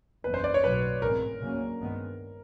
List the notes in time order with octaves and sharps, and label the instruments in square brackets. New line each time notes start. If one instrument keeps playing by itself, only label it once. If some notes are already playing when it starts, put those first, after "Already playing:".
[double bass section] F#1 E2 C#3 [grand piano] B4
[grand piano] C5
D5
C#5
[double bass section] B1 A2 F#3 [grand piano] B4
[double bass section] A1 G#2 E3 G#3 C4 [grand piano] A#4
[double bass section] D2 C#3 F#3 A#3 C#4
G2 D#3 G#3 B3